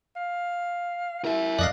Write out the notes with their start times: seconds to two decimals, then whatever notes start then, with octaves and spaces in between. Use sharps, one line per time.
0.16 F5
1.25 E4 A#4 E5
1.59 F2 D5 D#5 F5 F#6